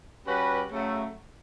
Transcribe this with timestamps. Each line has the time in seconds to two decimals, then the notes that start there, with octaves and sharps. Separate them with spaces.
0.25 G3 C#4 F#4 B4
0.68 C#3 F#3 A3